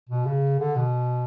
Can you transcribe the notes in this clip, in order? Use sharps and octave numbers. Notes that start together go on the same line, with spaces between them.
B2
C#3
D3
B2